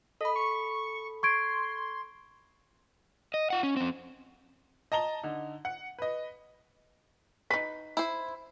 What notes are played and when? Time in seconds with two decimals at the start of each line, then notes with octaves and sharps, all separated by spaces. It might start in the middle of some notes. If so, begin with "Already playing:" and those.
0.21 A4 D#5 B5
0.36 C#6
1.23 C6 C#6 G#6 D7
3.34 D#5
3.50 F4 F#5
3.63 C#4
3.77 F2 C4
4.92 D#5 A5 A#5 G7
5.23 D3 D#4
5.65 F#5
5.99 B4 D#5
7.50 D#4 B4 B6
7.97 E4 C5